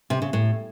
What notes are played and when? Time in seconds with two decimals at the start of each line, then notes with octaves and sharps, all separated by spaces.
0.10 C3
0.22 C#3
0.33 A2